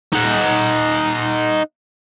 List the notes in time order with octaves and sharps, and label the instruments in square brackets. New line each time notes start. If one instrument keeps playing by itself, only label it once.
[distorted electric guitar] D#4 F#5